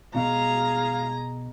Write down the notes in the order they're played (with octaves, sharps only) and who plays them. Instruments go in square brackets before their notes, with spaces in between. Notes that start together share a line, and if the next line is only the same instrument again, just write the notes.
[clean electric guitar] B2 [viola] G#4 A#5 [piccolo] F5